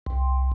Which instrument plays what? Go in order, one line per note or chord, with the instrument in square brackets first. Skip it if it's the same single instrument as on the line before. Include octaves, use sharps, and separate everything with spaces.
[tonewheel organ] C2